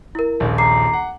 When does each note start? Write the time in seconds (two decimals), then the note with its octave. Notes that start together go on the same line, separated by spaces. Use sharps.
0.15 E4 A#4
0.40 D#1 A#1
0.58 A#5 D6 C7
0.93 F#5